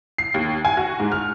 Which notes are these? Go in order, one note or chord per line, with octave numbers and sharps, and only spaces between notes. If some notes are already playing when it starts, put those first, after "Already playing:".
C7
D#2
G#5
F#4
G#2
F6